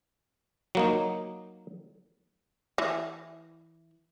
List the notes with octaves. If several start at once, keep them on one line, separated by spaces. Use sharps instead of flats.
F#3 A#3 D#4
E3